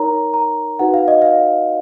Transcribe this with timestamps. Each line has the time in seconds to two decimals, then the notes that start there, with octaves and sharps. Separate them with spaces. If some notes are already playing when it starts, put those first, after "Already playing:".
Already playing: D#4 A#4 C#5 A#5
0.34 A#5
0.79 D#4 F#4 B4 F#5
0.94 F5
1.08 D#5
1.22 F5